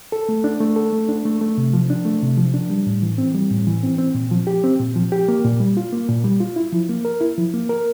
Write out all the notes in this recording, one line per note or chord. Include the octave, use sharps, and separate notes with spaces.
A4
A3
D4
A3
A4
A3
D4
A3
A3
C3
F3
D4
A3
C3
F3
D4
G3
A2
E3
C4
G3
A2
E3
C4
C4
A#2
F3
G4
C4
A#2
F3
G4
A#3
A#2
G3
F4
A#3
A#2
G3
F4
E4
F3
A#3
A#4
E4
F3
A#3
A#4